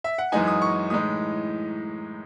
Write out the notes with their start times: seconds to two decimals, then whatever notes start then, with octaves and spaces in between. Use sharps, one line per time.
0.04 E5
0.18 F#5
0.32 F#2 E3 G#3 D#4 G#5
0.47 D#6
0.62 C#6
0.90 A2 E3 G#3 D#4 D#6